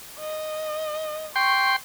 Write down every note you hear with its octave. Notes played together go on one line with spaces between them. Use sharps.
D#5
G5 C6 C#6